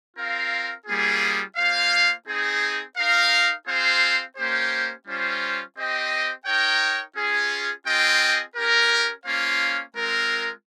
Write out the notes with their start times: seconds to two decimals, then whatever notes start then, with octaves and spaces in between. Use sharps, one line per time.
0.17 C4 F4 A#4 F5
0.86 G3 A#3 C#4 F4 G#4
1.56 A#3 F4 C5 F5
2.26 C4 D#4 G#4
2.97 D#4 A#4 F5
3.67 C4 F4 G#4 C5 F5
4.36 A#3 C#4 G4 C5
5.06 G3 C#4 F4 C5
5.76 C4 G4 C5 D#5 G5
6.45 D#4 A#4 C#5 G5
7.15 C#4 F4 G#4
7.86 C4 F4 G#4 D#5 G5
8.55 C#4 G4 A#4
9.26 A#3 C#4 F4 C5 F5
9.95 G#3 C4 F4 A#4